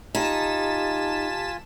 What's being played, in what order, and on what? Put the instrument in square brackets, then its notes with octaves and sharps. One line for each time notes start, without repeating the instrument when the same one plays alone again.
[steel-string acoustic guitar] D#4 [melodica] F4 G#5 [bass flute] G4 [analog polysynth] A5 B6 E7